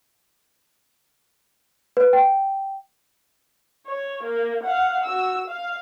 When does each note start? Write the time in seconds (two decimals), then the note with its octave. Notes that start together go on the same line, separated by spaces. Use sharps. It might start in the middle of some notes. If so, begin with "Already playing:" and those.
1.97 B4
2.13 G5
3.87 C#5
4.23 A#3
4.63 F5 F#5
5.05 F#4 E6
5.47 F5